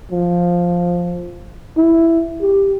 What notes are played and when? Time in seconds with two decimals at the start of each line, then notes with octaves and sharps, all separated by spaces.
0.11 F3
1.77 E4
2.41 G4